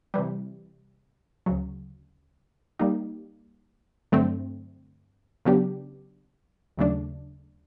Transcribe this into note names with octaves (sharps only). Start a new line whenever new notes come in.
C3 E3 G3
D2 C#3 F#3
G3 A#3 D#4 G4
G2 D3 F#3 A3 C4
C#3 F#3 B3 D4 G4
D#2 C#3 F#3 A3 D4